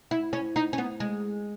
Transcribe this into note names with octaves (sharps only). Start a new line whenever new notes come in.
E4
C#4
D#4
C#4
B3
G#3